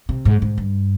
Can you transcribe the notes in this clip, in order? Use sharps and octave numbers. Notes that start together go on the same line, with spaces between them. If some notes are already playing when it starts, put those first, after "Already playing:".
C3
G#2
G#2
G2